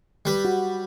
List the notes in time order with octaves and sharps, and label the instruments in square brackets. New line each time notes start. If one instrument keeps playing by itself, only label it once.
[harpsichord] G3 B4
[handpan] F#4